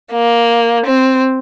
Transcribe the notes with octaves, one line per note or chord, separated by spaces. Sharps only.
A#3
C4